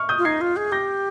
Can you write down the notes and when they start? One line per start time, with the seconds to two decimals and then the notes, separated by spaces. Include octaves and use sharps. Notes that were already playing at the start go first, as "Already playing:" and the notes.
Already playing: C#6 F6
0.09 D#6 G6
0.18 F4
0.25 D#4 G#6 C7
0.41 F4
0.56 G#4
0.72 G4 G6 A#6